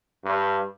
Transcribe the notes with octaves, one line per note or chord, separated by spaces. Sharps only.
G2